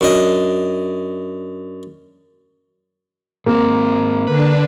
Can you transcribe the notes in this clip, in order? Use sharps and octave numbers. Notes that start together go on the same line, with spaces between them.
F#2 D4 D#5
G#2 A#3 C4
D3 D4 B4